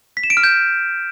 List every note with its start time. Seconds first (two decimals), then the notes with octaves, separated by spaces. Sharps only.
0.17 B6
0.24 E7
0.30 D7
0.37 F6
0.44 G6